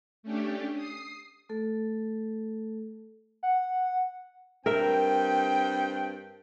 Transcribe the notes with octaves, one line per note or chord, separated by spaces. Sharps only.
A3 C#4 D4 G4
D#6 C7
A3 A4
F#5
G2 C4 A#4 E5 G5